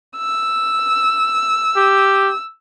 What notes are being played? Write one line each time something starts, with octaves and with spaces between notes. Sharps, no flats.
E6
G4